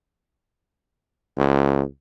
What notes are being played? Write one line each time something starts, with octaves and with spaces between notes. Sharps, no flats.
C#2